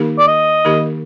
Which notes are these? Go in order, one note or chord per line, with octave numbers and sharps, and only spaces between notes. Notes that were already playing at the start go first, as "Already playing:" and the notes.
Already playing: D#3 A#3 D#4 G4 A#4
D5
D#5
D#3 A#3 D#4 G4 A#4